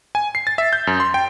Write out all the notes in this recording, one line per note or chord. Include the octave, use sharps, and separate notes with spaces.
G#5
C7
A6
E5
G6
F#2
C6
G5